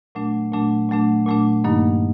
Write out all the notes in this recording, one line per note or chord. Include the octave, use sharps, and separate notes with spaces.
A#2 F#3 A3 D4
A#2 F#3 A3 D4
A#2 F#3 A3 D4
A#2 F#3 A3 D4
G2 D#3 F#3 A#3 D#4